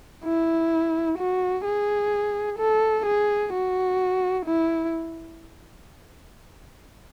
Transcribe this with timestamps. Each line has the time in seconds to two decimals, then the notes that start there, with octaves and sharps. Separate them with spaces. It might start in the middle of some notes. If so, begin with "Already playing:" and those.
0.24 E4
1.18 F#4
1.65 G#4
2.59 A4
3.05 G#4
3.53 F#4
4.46 E4